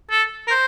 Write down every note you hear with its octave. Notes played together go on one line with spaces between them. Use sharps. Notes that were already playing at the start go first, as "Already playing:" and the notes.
A4
A#4
C5